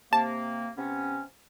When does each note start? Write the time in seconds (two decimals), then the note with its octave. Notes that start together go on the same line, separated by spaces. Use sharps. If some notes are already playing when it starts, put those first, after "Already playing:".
0.13 C3 A#3 A5
0.78 C3 B3 C#4